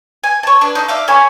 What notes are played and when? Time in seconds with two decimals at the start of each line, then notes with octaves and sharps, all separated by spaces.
0.24 G#5
0.43 C#5 A5
0.61 D4 B4
0.75 D#4 A4
0.88 D5 E5 F5
1.08 A4 C#5 G#5 B5